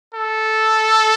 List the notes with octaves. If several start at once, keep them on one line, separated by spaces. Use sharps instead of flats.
A4